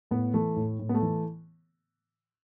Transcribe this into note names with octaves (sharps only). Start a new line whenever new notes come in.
A2 B3
E3 A3
A2
A2
B3
A3
E3